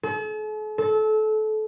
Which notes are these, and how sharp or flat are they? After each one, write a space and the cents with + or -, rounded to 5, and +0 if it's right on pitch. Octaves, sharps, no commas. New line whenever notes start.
A4 -45
A4 -25